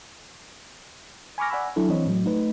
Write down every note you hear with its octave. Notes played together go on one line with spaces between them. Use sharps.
G#5 B5 C#6 D6 F6 A#6
D5 F#5 G#5 B5 E6
F#3 D4 E4 A4
E3 C4 C#5 D#5
A2 F#3
A3 D#4 B4